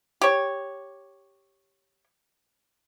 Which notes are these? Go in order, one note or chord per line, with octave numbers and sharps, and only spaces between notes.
G4 C#5